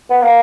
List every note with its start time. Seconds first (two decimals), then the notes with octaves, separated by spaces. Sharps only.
0.10 B3
0.21 A#3